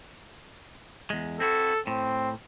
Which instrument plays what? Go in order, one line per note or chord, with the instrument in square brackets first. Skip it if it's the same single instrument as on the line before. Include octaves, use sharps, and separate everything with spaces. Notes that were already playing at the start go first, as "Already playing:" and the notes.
[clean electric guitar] E2 G#3
[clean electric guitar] C4 E4 F#4 [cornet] A4
[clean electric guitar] A2 [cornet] C4